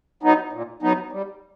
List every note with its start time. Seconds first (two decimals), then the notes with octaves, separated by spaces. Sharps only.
0.23 F#3 B3 D#4
0.52 A#2
0.82 F#3 B3 D#4
1.12 G3